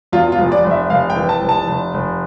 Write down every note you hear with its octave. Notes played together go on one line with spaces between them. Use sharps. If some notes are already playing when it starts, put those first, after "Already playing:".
E2 F4
F4
F1
D5
F1
E5
F1 F5
G5
E3
A5
F1
A5
F1
F1